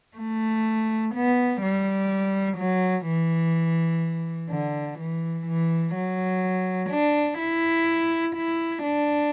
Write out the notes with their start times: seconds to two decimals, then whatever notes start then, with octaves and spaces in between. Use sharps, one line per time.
0.17 A3
1.14 B3
1.62 G3
2.58 F#3
3.06 E3
4.51 D3
4.99 E3
5.47 E3
5.95 F#3
6.91 D4
7.39 E4
8.36 E4
8.83 D4